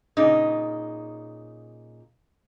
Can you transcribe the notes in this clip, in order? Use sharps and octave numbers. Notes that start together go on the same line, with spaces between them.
A#2 C#3 D#4